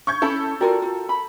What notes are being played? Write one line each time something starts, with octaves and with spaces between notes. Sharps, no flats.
C#6 G6 G#6
C#4 E4 A4 B5
F4 F#4 A#4 D5 G5 A#5
F4
B5